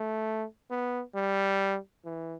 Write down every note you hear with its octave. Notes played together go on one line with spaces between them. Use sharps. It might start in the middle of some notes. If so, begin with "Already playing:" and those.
Already playing: A3
B3
G3
E3